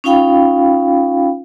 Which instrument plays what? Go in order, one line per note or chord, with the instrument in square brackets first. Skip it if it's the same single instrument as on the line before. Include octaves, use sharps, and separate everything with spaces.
[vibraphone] C#4 D#4 F4 F5 G5 B5